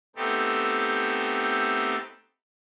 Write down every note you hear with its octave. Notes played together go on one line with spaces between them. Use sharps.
A3 B3 C4 D#4 G4 A4